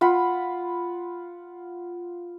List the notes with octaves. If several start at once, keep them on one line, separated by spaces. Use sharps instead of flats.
F4 F#5 B5